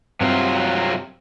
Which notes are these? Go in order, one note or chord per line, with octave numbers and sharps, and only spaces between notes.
G2 C3 F#3 C4 F4 E5